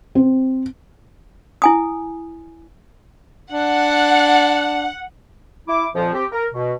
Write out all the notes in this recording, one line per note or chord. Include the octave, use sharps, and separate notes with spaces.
C4
E4 G#5 D#6
D4 F#5
E4 D6
F2 A#2 F3
C4 G4
A#4
B2